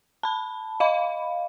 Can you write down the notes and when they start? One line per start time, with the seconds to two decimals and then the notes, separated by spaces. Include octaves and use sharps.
0.23 A5 B5
0.80 D#5 F5 B5